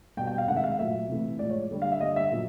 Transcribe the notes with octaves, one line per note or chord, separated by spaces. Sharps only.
B2 G3 G5
G5
F5
C3 D#3 G#3 F#5
E5
F5
A#2 F#3 A3 E5
C3 E3 A3
A2 F3 G#3 D5
C#5
D3 G3
F5
E5
D3 G3 D#5
E5
A#2 F#3